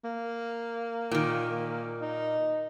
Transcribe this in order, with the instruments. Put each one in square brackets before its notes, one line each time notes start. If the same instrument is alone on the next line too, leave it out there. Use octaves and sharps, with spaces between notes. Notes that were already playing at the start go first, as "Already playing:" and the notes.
[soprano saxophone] A#3
[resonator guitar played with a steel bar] A#2 D#3
[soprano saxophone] D#4